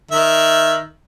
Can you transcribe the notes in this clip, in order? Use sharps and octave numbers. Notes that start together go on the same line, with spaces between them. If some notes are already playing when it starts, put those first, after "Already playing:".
D#3 E5